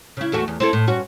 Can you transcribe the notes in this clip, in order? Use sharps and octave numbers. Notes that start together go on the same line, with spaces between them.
C#3 E4
E2 A3 F#4
E2
C4 E4 A4
A2
G2 C#4 F#4